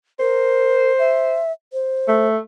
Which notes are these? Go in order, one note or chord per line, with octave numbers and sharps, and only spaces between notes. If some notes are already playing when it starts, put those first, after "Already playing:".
A#4 C5
E5
C5
A3